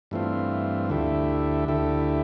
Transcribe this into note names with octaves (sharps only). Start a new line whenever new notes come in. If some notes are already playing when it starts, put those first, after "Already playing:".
G2 E3 A3 C4 F4
D2 D3 A3 E4 G4
D2 D3 A3 E4 G4